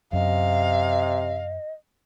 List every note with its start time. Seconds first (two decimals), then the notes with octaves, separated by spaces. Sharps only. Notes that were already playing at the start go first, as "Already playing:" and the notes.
0.13 F#2 C3 D#5 F5